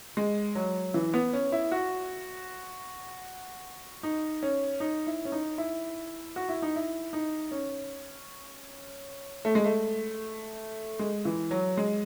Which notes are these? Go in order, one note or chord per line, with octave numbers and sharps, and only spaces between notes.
G#3
F#3
E3
B3
C#4
E4
F#4
D#4
C#4
D#4
E4
C#4
D#4
E4
F#4
E4
D#4
E4
D#4
C#4
A3
G#3
A3
G#3
E3
F#3
G#3